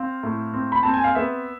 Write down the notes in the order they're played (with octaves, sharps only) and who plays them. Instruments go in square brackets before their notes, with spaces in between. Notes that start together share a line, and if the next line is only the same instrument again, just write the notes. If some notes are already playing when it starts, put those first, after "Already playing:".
Already playing: [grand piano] C4 F5
A2
C4
B5
C4 A5
G#5
F5
B3 E5